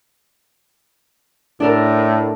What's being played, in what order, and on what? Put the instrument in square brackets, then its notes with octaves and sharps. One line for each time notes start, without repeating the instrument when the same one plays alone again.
[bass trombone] A2 [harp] D4 A4 A#4